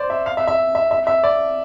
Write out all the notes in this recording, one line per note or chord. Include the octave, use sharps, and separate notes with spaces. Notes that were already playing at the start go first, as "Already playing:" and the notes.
Already playing: C5 D5
E5
F5
E5
E5
E5
E5
E5
D5